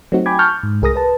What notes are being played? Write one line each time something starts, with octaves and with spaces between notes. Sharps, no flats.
F#3 A3 C4 D#4 F#4
G5 G#5 B5 D6 G#6
A5 C#6 F6 G6
G#2
C2 G#4 A#4 D#6 A#6
B4 A5